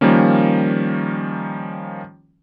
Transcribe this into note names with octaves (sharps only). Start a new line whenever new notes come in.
D#3 F3 G3 A#3 C#4